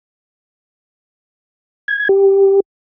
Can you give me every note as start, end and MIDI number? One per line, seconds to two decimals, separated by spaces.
1.88 2.08 92
2.09 2.60 67